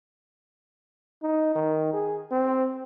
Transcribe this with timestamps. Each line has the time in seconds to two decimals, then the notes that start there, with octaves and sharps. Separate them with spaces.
1.23 D#4
1.55 D#3
1.93 G#4
2.31 C4